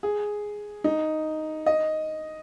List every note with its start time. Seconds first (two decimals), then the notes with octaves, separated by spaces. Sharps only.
0.03 G#4
0.84 D#4
1.66 D#5